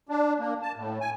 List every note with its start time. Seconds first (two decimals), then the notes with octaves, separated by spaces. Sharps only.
0.09 D4
0.40 A#3
0.62 A5
0.76 A2
1.01 G#5